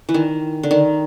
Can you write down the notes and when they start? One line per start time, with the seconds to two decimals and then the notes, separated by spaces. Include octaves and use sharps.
0.09 E3
0.14 D#3
0.63 D3
0.71 D#3